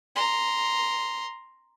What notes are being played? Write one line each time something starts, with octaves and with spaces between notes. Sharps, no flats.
A#5 C6